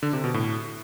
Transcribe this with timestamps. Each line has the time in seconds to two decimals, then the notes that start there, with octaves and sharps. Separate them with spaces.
0.03 D3
0.13 C3
0.24 B2
0.34 A2